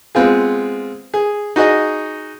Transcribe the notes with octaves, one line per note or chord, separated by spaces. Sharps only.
G#3 B3 C4 F4 G#4
G#4
D#4 F#4 G#4 D#5